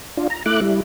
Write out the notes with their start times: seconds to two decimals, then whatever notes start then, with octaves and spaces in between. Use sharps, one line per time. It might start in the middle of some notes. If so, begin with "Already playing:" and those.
0.17 D4 F4
0.30 A#5
0.46 A3 E4 D6 F#6
0.61 G3 E4